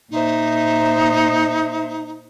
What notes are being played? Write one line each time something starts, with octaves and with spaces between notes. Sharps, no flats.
A#2 D#4 C5 E5